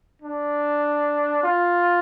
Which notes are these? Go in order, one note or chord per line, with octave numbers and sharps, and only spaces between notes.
D4
F4